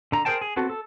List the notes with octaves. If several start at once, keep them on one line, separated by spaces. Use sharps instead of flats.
D3 A#5
G#4 A#4 C5 G5 A5
G#4
B3 C4 F#4 A4
A4